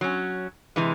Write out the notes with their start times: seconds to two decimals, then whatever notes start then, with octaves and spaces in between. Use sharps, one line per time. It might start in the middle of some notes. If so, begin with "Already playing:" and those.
0.01 F#3 C#4
0.76 C3 E3 G#3